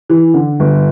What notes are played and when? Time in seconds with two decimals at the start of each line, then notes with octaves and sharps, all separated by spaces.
0.09 E3
0.34 D3
0.60 G1